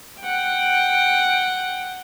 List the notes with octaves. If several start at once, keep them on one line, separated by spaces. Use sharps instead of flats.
F#5 G5